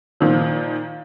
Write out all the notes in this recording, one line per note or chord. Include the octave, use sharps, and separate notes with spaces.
A#2 D#3 F3